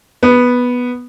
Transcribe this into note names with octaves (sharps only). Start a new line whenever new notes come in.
B3